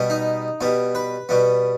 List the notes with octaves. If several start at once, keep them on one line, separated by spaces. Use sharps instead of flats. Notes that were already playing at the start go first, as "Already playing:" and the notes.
Already playing: B2 G3 B3
D#4
B2 G3 B3
B4
B2 G3 B3